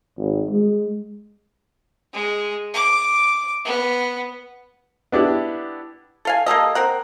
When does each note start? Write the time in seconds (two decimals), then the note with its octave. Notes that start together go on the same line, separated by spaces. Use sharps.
0.18 G#1
0.51 G#3
2.13 G#3
2.73 D6
3.65 B3
5.12 B3 D4 E4 G4
6.25 A4 F5 G#5
6.46 A#3 G4 A4 D#5
6.75 C4 A#4 F#5